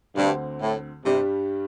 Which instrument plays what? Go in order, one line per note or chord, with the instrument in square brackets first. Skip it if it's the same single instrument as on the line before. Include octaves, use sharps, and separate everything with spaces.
[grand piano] D2 D3 C4 [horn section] G2
[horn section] A2
[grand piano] G2 G3 D4 G4 [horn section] C3